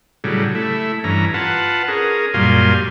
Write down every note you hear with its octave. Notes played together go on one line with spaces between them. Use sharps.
A2 C#3 F#3 G3
A3 E4
G2 E3 C#4 A#5
F4 B4 F#5 A5
C#4 G#4 A#4
F#2 A#2 G3 F5 G#5 C6